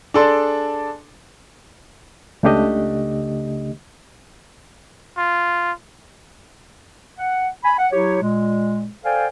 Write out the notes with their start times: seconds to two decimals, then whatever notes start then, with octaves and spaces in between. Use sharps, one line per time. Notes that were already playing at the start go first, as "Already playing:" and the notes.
0.14 D4 G#4 A4 D5 C6
2.43 C#2 C#3 A3 D4 G4 D#5
5.18 F4
7.18 F#5
7.64 G#5 B5
7.78 F#5
7.92 F#3 E4 G4 C#5
8.21 A#2 G#3
9.04 A4 C5 D5 F5 G5 G#5